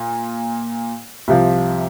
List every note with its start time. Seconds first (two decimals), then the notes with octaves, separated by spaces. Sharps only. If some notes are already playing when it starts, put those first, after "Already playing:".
Already playing: A#2
1.28 C2 C3 F3